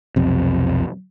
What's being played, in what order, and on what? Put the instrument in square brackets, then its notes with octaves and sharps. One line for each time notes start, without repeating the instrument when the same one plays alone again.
[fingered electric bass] B1 F2 C3